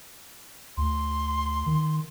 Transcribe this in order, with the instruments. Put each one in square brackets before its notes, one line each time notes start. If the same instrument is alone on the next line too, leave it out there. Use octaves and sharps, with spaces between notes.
[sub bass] D2 [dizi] C6
[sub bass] D#3